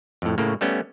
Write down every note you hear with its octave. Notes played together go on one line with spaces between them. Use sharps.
F2 A2
A2 C#3 A#3
G3 A3 B3 C#4